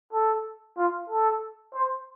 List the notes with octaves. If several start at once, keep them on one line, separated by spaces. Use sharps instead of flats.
A4
F4
A4
C5